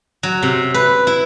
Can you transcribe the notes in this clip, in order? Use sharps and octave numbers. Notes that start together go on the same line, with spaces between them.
F#3
C3
B4
E4